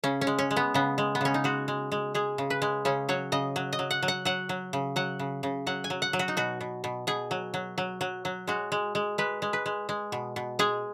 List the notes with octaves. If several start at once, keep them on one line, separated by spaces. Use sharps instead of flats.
C#3 C#4
C#4
G#3
C#4
G#3
B3
C#3 B3
G#3
B3
C#3 C#4
D#4
G#3 F#4
G#3
G#3
G#3 G#4
C#3
B4
G#3
C#3 C#4
F#3 C#5
C#3 D#5
F#3
D#5
F#3
F#5
F#3
F#5
F#3 F#5
F#3
C#3
F#3 F#5
C#3
C#3
F#3 F#5
G#5
F#3
F#5
F#3
F#4
D#4
B2 F#4
B2
B2
B2 G#4
F#3
F#3
F#3
F#3
F#3
G#3 F#4
G#3
G#3
G#3 B4
G#3
B4
G#3
G#3
B2
B2
G#3 G#4